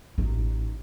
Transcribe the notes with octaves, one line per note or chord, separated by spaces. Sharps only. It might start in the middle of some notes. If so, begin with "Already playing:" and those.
A1 D#4